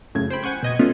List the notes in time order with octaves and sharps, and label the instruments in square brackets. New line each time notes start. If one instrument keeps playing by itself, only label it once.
[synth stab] F#2 A2 C#3 G#6
C5 G5 B5
F#5 G#5 C#6 G6
B2 D#5 G#5
A3 B3 C#4 F4